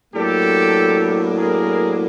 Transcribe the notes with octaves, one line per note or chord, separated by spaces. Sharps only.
A2 F#3 A#3 D4 G4 A4
G#4 A#4